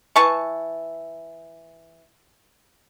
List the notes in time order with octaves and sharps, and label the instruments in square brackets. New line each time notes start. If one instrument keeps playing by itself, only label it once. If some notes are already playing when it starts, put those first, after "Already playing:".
[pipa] E3 A5 C#6